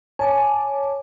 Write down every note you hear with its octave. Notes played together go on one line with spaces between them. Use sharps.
C#5 G#5 A5 D6